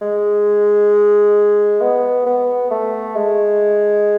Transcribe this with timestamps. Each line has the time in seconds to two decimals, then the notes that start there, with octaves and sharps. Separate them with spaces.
0.02 G#3
1.81 B3
2.26 B3
2.71 A3
3.16 G#3